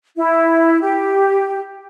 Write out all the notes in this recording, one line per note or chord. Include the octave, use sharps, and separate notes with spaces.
E4
G4